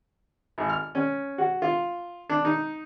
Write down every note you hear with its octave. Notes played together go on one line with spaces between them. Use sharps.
G#1
F6
C#4
F#4
F4
D4
D#4